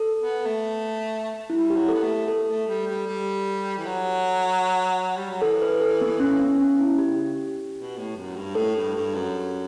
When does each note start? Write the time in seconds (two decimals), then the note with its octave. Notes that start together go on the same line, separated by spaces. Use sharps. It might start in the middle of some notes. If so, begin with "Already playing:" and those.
Already playing: A4
0.19 B3
0.46 A3
1.50 G3 E4
1.70 G4
1.76 F#3
1.89 B3 A4
2.03 A3
2.28 A4
2.48 A3
2.68 G3
2.87 G3
3.07 G3
3.78 E3
3.85 F#3
5.17 G3
5.30 F#3
5.42 E3 A4
5.62 B4
5.81 A4
6.01 B3
6.20 C#4
6.39 B3
6.60 C#4
6.79 E4
6.98 C#3 G4
7.78 B2
7.97 A2
8.17 F#2
8.36 G2
8.55 A2 A4
8.76 G2
8.95 G2
9.15 F#2